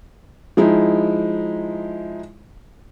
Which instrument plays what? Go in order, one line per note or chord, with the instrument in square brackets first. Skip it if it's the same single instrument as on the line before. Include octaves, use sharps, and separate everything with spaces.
[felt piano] F3 G#3 D#4 E4